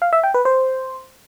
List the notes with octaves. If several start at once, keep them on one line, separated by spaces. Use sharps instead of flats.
F5
E5
G5
B4
C5